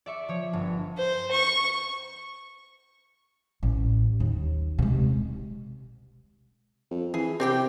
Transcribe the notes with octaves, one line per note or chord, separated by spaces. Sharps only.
D5 E5 C#6
F3 C#5
G1
C5
C#6
A1
D#2
C3 G#3
F2
E3 G#4
C3 C4 G4 G5